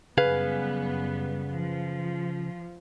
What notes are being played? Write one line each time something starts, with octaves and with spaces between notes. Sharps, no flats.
F#2 C#3 G3 B3 G#4 B4 F5
F3